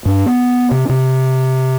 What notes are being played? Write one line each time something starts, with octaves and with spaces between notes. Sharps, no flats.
G2
B3
C3
C3